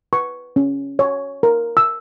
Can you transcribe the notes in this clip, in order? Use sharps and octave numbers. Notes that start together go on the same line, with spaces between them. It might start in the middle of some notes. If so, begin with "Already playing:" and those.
B4 C#6
C#4
C#5
A#4
E6